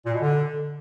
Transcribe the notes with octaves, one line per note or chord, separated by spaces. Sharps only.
A#2
B2
D3